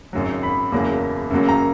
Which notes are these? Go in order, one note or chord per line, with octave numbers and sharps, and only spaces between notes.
G#1 F#2 C#3 F#3
B5
F#1 E2 C#3 F#3 A#3
F#2 C#3 F#3 A#3
A#5